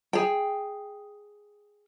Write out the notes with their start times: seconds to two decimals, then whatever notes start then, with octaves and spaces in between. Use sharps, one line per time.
0.13 G#4 G5